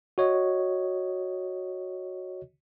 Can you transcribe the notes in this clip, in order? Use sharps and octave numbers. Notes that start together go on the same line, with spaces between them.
F#4 C#5 D#5